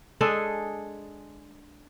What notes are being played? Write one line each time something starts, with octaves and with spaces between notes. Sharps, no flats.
G#3 D4 G#4 A4